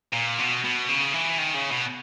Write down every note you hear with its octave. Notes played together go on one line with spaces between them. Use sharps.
A#2
B2
B2
C#3
E3
D#3
C#3
B2